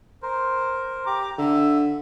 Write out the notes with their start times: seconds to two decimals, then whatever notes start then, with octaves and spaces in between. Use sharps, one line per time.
0.22 A#4 C5
1.06 G4 A#5 D6
1.38 D3 E5